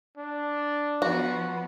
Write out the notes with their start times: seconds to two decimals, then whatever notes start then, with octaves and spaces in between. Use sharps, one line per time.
0.17 D4
1.02 F3 B3 F#4